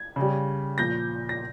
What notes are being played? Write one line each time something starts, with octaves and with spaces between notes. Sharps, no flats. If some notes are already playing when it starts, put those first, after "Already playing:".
Already playing: G#6
C#3 G3
A#2 F3 G6 A#6
A#6